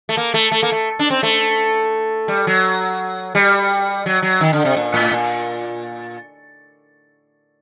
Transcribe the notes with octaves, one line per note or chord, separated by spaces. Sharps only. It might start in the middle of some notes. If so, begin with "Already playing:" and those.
A3
A#3
A3
A3
A#3
A3
D4
C4
A3
G3
F#3
G3
F#3
F#3
D#3
D3
C3
A#2
A2
A#2